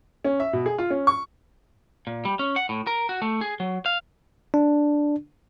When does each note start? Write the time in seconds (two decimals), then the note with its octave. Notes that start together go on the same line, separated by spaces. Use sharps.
0.25 C#4
0.40 E5
0.53 B2
0.66 G#4
0.78 F4
0.90 C#4
1.07 C#6
2.07 A#2
2.25 G3
2.39 C#4
2.56 F#5
2.69 A2
2.87 A#4
3.09 F#4
3.22 A3
3.41 G#4
3.60 F#3
3.86 F5
4.54 D4